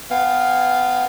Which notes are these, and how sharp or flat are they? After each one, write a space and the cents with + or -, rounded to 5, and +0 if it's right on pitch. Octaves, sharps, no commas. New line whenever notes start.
B3 +20 F5 +0 G#5 -45